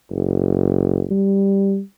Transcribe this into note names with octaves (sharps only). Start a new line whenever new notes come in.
F#1
G3